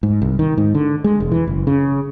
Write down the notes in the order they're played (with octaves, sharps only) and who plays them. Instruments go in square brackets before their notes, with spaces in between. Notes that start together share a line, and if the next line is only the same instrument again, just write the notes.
[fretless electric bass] G#2
C2
D#3
G#2
D3
G#3
E1
E3
F#1
C#3